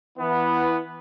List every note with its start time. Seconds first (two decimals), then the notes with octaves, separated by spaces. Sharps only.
0.19 E3 B3